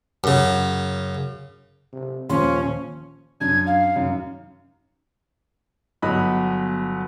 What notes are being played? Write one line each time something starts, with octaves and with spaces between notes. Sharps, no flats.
F#2 C#3
C3
D#1 F3 C#4 C6
F#2 D4 G#6
F5
F#2 D#3
G1 F#3 B3 D#5 B5 F#6